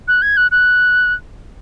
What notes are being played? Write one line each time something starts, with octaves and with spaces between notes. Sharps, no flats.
F#6
G#6
F#6
F#6